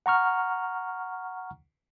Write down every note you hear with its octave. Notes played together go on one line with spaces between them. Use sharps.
F#5 A#5 C#6 F6